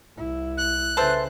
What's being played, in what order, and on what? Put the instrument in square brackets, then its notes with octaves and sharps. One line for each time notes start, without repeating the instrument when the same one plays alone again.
[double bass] C2 E4
[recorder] F#6
[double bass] C#3 [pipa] A4 C5 [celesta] B4 E5 A6